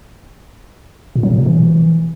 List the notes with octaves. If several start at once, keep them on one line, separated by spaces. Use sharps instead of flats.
A#2
F#3
A#2
B2
E3